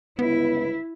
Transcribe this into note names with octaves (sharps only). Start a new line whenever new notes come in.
G1 C#2 B3 E4 B4